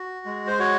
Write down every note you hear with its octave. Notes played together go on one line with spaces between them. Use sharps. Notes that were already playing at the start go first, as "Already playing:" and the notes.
Already playing: F#4
G#3
C5
F#4 C#5